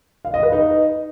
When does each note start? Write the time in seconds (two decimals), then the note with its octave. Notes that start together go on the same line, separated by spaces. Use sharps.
0.25 F5
0.34 D#5
0.43 B4
0.52 D#4